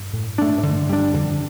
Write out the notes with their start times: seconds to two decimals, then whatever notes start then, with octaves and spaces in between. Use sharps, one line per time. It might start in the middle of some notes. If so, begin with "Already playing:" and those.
Already playing: G2
0.13 A2
0.38 A3 D4
0.58 A2
0.63 G2 D3
0.90 G3 D4
1.14 F2 D3